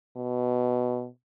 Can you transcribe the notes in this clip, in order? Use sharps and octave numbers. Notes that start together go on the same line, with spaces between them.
B2